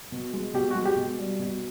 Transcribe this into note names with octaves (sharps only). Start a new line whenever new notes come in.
B2
G#3
B2 G4
F#4
G#3
G4
B2
G3
B2